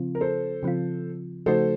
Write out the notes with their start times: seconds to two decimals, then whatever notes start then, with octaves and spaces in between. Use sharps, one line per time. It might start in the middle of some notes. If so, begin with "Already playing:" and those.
Already playing: C#3 F3 C4 F4
0.15 A#4
0.21 A4 C5
0.63 C#3 F3 C4 F4
1.46 C#3 F3 A3 D#4 F#4 A4 C5